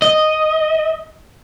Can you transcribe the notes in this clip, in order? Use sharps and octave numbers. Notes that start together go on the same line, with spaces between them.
D#5